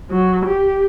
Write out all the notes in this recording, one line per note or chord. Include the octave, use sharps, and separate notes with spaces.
F#3
G4